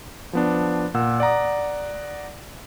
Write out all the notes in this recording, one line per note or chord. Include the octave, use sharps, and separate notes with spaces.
F3 B3 D4
A#2 F#5 E6
D5 F#5 A#5 D#6